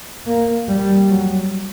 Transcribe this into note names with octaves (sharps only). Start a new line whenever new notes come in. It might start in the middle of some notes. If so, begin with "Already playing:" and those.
A#3
G3
F#3